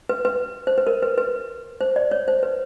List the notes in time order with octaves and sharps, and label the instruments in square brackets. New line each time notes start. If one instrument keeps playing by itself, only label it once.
[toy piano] B4
B4
C5
B4
A#4
B4
B4
C5
D5
C#5
C5
B4